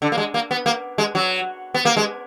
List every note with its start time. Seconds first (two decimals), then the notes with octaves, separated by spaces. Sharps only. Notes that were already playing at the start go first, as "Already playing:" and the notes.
0.02 D3
0.12 A#3
0.18 G#3
0.34 A#3
0.51 B3
0.66 A#3
0.98 G#3
1.15 F#3
1.74 B3
1.85 A#3
1.97 G#3